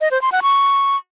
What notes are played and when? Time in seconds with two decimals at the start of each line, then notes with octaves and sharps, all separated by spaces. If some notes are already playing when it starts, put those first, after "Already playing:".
0.01 D#5
0.11 C5
0.22 C6
0.32 F#5
0.42 C#6